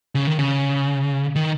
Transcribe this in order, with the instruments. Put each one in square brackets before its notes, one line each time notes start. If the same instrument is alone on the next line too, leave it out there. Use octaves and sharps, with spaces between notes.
[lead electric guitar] C#3
D#3
C#3
D#3